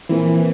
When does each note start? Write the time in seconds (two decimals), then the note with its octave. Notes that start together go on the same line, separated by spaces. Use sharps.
0.09 A#2 E3 F3 C4 E4 A#4